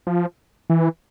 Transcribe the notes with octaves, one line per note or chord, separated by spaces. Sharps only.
F3
E3